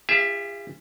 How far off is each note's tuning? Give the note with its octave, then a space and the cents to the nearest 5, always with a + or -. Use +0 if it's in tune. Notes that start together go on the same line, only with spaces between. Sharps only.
F4 -35 G#4 -45 E5 +0